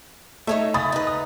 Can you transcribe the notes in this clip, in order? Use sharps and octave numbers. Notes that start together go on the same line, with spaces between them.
A3 D#4 C#5 E5
C#3 B5 D#6 A6
D#4 B4
D#6